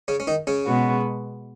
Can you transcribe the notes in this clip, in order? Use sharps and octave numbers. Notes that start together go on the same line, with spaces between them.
C#3 C#4
C#4
D#3 D#4
C#3 C#4
B2 G#3 B3 F#4